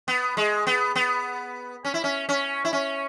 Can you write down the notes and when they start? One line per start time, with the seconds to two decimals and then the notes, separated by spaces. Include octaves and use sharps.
0.08 B3
0.37 G#3
0.67 B3
0.96 B3
1.85 C#4
1.94 E4
2.04 C#4
2.29 C#4
2.65 E4
2.73 C#4